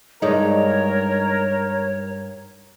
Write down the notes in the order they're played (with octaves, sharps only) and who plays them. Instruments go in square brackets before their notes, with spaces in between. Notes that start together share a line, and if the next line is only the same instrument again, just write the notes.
[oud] G2 G#3 D#4 [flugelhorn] A#4 [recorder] C#5